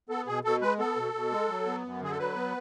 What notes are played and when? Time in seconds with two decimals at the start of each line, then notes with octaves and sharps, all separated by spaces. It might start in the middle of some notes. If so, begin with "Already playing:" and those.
0.09 B3 A4
0.27 B2 G#4
0.44 B2 A4
0.62 G#3 B4
0.79 B3 A4
0.96 B2
1.14 B2
1.31 G#3
1.48 F#3
1.66 B3
1.83 F#2
2.01 D3 G#4
2.11 A4
2.18 F#3 B4
2.35 B3